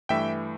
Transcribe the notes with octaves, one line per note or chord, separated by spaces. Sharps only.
G2 E3 A3 E5 G5